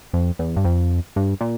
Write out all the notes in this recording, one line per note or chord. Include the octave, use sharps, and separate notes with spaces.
F2
E2
G2
F2
G2
A#2